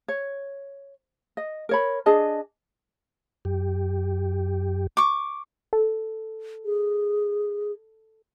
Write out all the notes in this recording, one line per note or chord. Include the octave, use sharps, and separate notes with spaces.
C#5
D#5
A#4 C#5 B5
D4 G#4 D#5 A5
F#2 G4
C#6 D6
A4
G#4